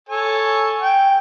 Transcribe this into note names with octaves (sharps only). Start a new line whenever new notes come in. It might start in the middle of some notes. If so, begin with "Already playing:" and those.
A4 C#5 G#5
G5